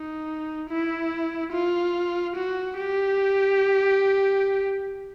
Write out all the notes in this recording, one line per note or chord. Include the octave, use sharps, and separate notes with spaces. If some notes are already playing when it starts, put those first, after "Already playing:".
Already playing: D#4
E4
F4
F#4
G4